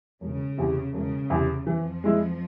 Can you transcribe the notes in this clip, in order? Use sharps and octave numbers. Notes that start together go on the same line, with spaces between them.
E1 C#3
E2 C3
E1 C#3
E2 C3
F2 E3 F3
G#3 E4